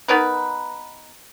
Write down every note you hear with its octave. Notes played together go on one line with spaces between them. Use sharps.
B3 D#4 A#4 B4